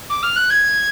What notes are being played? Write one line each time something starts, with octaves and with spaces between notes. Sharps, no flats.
D6
F6
F#6
G#6